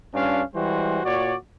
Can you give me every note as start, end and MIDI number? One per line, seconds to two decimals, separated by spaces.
0.14 0.42 43
0.14 0.42 61
0.14 0.42 62
0.14 0.42 65
0.14 0.42 77
0.55 1.00 52
0.55 1.00 55
0.55 1.00 56
0.55 1.00 66
0.55 1.00 72
1.04 1.36 46
1.04 1.36 66
1.04 1.36 73
1.04 1.36 74